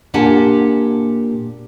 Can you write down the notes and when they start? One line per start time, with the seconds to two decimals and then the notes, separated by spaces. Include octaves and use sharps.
0.14 A#2 D4 G4 F#5 G#5 A5